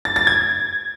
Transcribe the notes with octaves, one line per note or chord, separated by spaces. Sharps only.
A6
A6
G#6